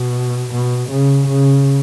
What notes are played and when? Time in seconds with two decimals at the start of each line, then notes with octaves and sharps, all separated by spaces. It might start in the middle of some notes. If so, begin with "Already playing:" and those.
Already playing: B2
0.53 B2
0.90 C#3
1.28 C#3